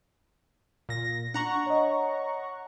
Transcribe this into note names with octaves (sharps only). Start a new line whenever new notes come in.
A#2 A#6
D4 F#5 A#5 C#6
C#5 D#5